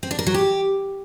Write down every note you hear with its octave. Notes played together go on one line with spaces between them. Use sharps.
C4
D4
A#4
F#3
G4